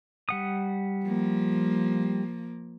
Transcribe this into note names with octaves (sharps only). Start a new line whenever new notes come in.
G3 F#5 D#6
F3 A#3